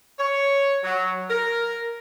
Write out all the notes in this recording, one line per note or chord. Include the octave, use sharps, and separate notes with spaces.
C#5
F#3
A#4